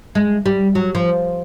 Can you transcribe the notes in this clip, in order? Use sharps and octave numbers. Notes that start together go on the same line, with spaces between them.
G#3
G3
F#3
F3